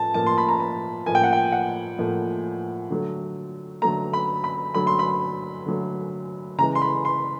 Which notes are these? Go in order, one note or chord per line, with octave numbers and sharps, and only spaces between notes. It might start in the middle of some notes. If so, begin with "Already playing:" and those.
Already playing: A2 F3 A5
A2 F3 A#3 A5
C6
B5
A#5
A5
A2 F3 A#3 G#5
G5
F#5
G5
F#5
A2 F3 A#3
D3 F#3 A3
D3 F#3 A3 A#5
B5
B5
D3 F#3 A3 B5
C6
B5
D3 F#3 A3
C#3 E3 G#3 A#5
C6
B5
C6